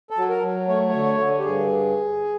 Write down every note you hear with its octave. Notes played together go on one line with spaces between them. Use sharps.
A4
F#3
A#4
F#3
A3 C#5
D3 C#5
D3
G4
G2 G#4